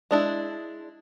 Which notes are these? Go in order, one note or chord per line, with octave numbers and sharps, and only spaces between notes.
G#3 D4 E4